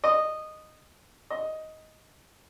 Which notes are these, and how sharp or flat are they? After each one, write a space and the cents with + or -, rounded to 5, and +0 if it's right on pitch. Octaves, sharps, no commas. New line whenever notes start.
D#5 -10
D#5 +10